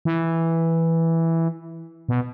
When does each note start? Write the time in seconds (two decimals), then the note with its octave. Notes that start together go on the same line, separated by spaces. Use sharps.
0.05 E3
2.09 B2